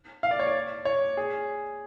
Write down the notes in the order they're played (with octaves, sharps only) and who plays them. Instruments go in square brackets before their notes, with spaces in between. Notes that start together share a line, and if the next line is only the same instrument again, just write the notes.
[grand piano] F5
D5
C#5
D5
C#5
G#4